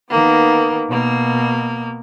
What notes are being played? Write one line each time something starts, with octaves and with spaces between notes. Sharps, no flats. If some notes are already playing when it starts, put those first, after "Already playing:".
D#3 A#3 B3
B2 A#3